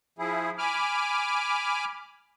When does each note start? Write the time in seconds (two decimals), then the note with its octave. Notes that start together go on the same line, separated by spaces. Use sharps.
0.19 F3 E4 G#4
0.58 G#5 B5 D6 F6